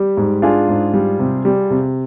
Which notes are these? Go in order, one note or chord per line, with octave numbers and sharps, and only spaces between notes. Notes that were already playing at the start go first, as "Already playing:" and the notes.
Already playing: G3 G4
G#2
D4 F4 G#4
G#2
G3
C3
G3
C3